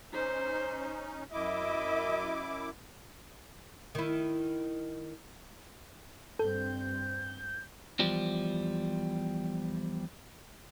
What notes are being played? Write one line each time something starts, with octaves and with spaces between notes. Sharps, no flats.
C#4 D#4 C5
F#2 E4 D#5 E5 D6
D#3 E4
G2 C4 A4 G6
E2 F3 G3